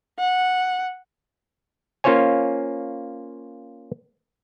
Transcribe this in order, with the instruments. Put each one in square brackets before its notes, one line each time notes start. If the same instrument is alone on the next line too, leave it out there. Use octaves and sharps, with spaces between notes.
[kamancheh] F#5
[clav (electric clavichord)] A#3 C#4 F4 C5 C#5 G#5